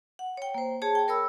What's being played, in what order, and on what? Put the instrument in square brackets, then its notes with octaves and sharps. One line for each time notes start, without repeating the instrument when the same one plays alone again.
[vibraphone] F#5
C#5 G5
A#3 C5
G#4 C#5 A5
G5
A#4 C#5 B5 E6